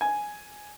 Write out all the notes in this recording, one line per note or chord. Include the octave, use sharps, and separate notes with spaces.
G#5